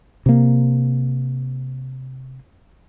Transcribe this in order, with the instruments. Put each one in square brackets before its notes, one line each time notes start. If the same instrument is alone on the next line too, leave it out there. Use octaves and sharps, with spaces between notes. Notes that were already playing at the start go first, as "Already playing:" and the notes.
[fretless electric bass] C3 A#3